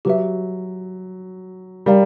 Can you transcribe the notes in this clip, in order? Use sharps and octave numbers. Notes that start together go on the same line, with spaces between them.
F#3 G4 B4 E5
G3 A#4 D5 F5 A#5